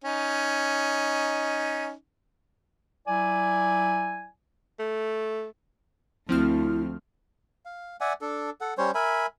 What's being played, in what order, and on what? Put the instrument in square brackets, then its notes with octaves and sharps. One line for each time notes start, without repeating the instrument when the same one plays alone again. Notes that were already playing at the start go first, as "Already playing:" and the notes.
[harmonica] C#4 D#4
[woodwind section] F#3 E4 D5 G#5
[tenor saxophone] A3
[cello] D2 [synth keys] F3 C4 F6 [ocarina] E4
[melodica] F5
D5 E5 F#5 G#5
D4 A4
A4 F#5
G3 C#4 C5 C#5
A#4 E5 G#5 B5